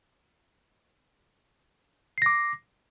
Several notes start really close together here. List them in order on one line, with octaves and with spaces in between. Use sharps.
C7 A#6 D6